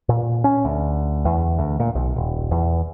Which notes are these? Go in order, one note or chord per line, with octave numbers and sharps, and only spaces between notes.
A#2
C#4
D2
E2
D2
A#2
B1
D#1
E2